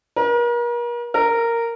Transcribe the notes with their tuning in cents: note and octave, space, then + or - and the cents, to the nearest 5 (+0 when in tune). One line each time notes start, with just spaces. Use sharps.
A#4 +40
A#4 -10